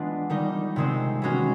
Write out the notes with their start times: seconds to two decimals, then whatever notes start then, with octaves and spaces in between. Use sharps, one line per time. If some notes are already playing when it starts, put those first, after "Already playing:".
Already playing: E3 G#3 B3 D4 F4
0.30 D#3 G3 A#3 D#4
0.76 C3 D#3 G#3 C4
1.22 E3 G#3 C#4 F#4